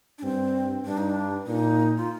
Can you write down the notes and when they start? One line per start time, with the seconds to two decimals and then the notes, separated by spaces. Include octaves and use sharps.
0.18 D4
0.23 G2 C4
0.85 G2 D4
0.98 D#4
1.10 D4
1.47 A#2 D#4
1.97 F4